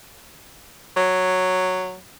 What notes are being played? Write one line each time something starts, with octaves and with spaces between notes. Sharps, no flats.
F#3